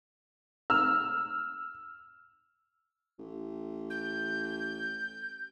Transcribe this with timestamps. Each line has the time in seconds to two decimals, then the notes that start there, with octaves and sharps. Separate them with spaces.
0.70 E6 F6
3.19 A1
3.90 G6